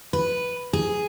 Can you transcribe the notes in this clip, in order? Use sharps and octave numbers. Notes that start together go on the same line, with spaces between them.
B4
G#4